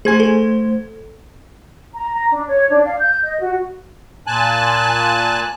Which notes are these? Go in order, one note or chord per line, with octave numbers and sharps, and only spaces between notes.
A3 G#4 C5 G#5 G#6
A4
A#5
A#5
D4
C#5
D4
F5
G6
D#5
F#4
A#2 G#5 A5 F#6